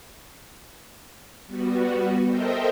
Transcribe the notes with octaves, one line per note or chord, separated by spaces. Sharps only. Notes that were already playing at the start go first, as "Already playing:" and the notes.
G3 B3 F#4
A4 A#4 C5 D#5 E5 G5